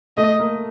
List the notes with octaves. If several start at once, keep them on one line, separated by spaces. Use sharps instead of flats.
A3 D#5
A#3